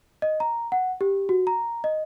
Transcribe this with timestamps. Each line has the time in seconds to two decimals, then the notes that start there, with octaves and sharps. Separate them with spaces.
0.22 D#5
0.40 A#5
0.72 F#5
1.01 G4
1.29 F#4
1.47 A#5
1.84 D#5